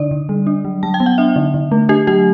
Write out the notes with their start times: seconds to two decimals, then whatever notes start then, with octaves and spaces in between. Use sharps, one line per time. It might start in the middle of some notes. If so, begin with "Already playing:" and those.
Already playing: D3 D4 D5
0.11 D3
0.29 G3
0.47 D4
0.65 F#3
0.83 F#3 A5
0.94 G5
1.00 B3
1.06 F#5
1.18 D4 E5
1.36 D3
1.54 D3
1.72 A3
1.89 D4 G4
2.07 F#3 G4